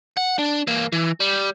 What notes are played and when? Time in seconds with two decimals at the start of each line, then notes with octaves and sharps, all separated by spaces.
0.17 F#5
0.39 D4
0.67 E3 A#3
0.92 E3
1.20 G3